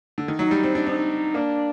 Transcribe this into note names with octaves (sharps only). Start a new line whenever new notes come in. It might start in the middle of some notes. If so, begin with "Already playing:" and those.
D3
D#3
F#3 D#4
G3
C4
D4
C4 D#4
A#3 D4